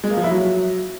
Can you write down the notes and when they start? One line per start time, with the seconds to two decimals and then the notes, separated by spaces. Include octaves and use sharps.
0.04 G#3
0.10 A#3
0.17 F3
0.24 E4
0.30 F#3